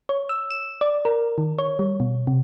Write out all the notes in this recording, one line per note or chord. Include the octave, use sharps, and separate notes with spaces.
C#5
E6
E7
D5
A#4
D#3
C#5
G3
B2
C3